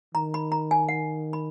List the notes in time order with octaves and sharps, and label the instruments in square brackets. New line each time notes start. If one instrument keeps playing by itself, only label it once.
[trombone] D#3 [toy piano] A#5
[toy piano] B5
A#5
G#5
F#5
B5